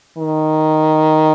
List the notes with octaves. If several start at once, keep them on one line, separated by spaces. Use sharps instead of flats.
D#3